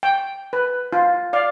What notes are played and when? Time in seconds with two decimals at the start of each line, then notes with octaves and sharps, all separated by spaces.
0.03 G5
0.53 B4
0.93 F4
1.33 D5 F5